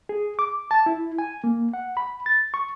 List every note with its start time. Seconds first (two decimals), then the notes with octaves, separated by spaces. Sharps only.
0.09 G#4
0.39 D6
0.71 A5
0.86 E4
1.18 G#5
1.44 A#3
1.73 F#5
1.97 B5
2.26 A6
2.54 C#6